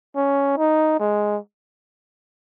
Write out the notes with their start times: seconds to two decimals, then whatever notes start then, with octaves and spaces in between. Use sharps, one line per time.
0.16 C#4
0.57 D#4
0.99 G#3